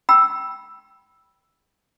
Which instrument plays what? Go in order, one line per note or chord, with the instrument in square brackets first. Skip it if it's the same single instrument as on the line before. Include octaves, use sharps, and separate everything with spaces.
[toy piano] G5 B5 E6